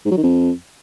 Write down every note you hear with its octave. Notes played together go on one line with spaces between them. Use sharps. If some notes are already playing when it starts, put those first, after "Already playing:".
G#2
F#3
D#3
F2